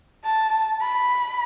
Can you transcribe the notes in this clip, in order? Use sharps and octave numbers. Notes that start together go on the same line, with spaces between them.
A5
B5